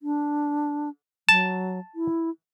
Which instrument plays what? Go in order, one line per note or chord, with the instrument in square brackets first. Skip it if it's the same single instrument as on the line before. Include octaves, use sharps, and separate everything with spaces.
[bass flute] D4
[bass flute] F#3 [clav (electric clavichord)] A5
[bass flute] E4